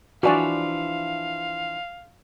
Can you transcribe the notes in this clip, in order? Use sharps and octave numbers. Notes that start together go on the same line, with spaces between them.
E3 F3 D4 F#4 D5 F5 G#5 B5